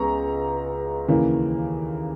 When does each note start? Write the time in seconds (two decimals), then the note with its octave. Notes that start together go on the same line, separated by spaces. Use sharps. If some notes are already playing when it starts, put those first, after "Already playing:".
Already playing: C#2 C#3 G#3 B3 A#5 C#6
1.08 D#2 C#3 E3 A#3